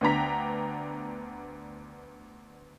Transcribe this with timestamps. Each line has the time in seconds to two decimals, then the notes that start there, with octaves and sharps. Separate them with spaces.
0.01 D2 B3 D4 G5 A#5 B6